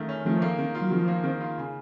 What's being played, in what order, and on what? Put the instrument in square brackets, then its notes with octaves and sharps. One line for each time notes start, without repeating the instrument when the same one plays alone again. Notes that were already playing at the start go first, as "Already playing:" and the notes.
Already playing: [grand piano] D#3 A3 F4
C#4
[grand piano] D#3 [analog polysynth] F3 A3
[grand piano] A#3
D#3
F4
[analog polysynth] F#3
[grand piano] D#3 [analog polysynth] F3
[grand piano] A#3
D#3
F4
C#3